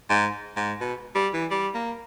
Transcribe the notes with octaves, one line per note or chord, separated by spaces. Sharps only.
G#2
G#2
B2
G3
E3
G3
A#3